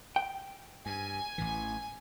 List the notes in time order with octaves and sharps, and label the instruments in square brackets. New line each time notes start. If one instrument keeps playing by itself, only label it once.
[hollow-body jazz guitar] G5
[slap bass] G2 [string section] G#5
[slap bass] A1 A2 E3